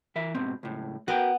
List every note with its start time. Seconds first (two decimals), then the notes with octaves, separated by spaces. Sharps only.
0.16 E3 A#4 E5
0.35 G#2 B2 C4
0.63 C#2 A2
1.08 B3 F#4 A#4 G5